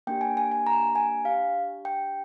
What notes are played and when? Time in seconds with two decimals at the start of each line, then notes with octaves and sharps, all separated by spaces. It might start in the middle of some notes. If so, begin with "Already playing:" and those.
0.07 A#3 D4 G4 G5
0.21 G#5
0.37 G#5
0.52 G#5
0.67 A#5
0.95 G#5
1.25 D4 G4 F5
1.85 G5